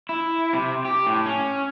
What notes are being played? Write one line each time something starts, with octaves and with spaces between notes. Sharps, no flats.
E4
C3
G4
A2
C#4